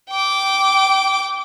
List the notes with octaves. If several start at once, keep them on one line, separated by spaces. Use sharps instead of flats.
G5 D6